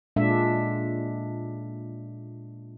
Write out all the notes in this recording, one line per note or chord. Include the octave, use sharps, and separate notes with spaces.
A#2 G#3 D4 F4 E5